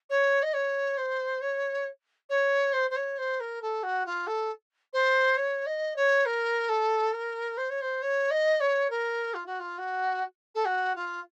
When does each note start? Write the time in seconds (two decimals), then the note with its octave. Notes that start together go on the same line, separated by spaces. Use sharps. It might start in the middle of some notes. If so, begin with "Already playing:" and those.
0.10 C#5
0.43 D#5
0.54 C#5
0.97 C5
1.41 C#5
2.30 C#5
2.73 C5
2.90 C5
2.96 C#5
3.18 C5
3.40 A#4
3.62 A4
3.83 F#4
4.06 F4
4.27 A4
4.93 C5
5.37 C#5
5.66 D#5
5.96 C#5
6.26 A#4
6.69 A4
7.13 A#4
7.58 C5
7.70 C#5
7.82 C5
8.02 C#5
8.31 D#5
8.60 C#5
8.90 A#4
9.34 F4
9.46 F#4
9.60 F4
9.78 F#4
10.55 A4
10.65 F#4
10.96 F4